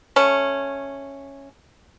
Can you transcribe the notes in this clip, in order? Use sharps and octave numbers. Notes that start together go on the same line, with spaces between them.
A3 C#4